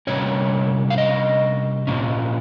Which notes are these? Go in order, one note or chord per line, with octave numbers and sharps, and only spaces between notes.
C3 G3 A#3 C#4 C#5
F5
D#5
A#2 F3 A#3 C#4